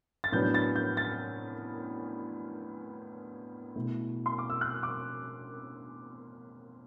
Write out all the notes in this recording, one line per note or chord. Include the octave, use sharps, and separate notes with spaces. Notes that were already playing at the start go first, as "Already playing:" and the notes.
A6
A2 F#3 B3 D4 G6
A6
G6
A6
B2 A3 E4
C6
D6
E6
F#6
D6